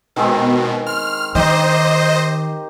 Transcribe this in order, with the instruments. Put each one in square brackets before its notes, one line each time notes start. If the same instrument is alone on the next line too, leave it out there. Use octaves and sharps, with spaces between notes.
[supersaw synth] B2 [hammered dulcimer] D#3 G#3 C4
[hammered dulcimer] C6 [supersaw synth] F6
[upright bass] D#3 [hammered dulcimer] D#4 G4 [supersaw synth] C5 D#5